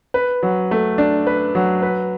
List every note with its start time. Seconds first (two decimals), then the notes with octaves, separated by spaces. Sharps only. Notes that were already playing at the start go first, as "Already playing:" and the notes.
0.14 B4
0.43 F#3
0.71 A3
0.98 D4
1.27 B4
1.55 F#3
1.82 B4